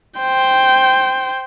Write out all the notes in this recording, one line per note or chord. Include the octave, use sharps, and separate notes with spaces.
C5 G5